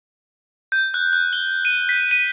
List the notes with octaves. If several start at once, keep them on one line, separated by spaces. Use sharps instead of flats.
G6
F#6
F#6
G7
D#7
B6
D#7